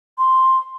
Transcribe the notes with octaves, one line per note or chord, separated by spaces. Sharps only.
C6